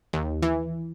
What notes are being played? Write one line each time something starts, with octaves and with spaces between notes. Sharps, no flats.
D#2
E3